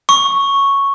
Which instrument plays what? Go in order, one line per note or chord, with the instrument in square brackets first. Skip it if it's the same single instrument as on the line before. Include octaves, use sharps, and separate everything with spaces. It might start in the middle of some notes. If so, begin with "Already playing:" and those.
[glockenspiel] C#6